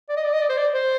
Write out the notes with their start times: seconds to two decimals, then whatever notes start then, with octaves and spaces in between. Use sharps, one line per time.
0.09 D5
0.16 D#5
0.25 D5
0.33 D#5
0.42 D5
0.49 C5
0.58 D5
0.74 C5